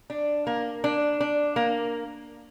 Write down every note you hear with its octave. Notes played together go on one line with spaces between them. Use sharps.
D4
A#3
D4
D4
A#3